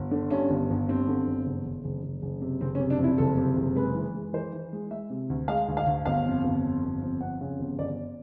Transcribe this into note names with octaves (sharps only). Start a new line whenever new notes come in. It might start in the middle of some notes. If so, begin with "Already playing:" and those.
Already playing: G1
D3
G2 C#4
G1
G1
G2 C4
D3
G1
F#1
F#1
F#1
F#1
F#1
C3
F#1 C4
C#4
C3
D4
F2
E4
F#1 A4
C3
F#1
G#3 B4
E3
G#3
E3 C5
E3
G#3
G#3 E5
C3
D2
G#3 F5
D2
F5
D2
G1 F5
F2
G1
F2
G1
F2
F2 F#5
C#3
G1
G1 D5